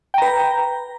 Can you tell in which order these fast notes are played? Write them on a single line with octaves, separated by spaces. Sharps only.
G5 A#5 B4